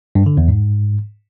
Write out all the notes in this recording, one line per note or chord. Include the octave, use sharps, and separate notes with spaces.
G2
D3
E2
G#2